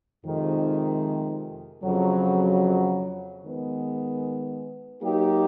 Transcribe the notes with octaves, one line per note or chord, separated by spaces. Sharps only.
F2 C3 D#3 G#3
F2 C#3 F#3
D#3 G#3 B3
F#3 A#3 D#4 G4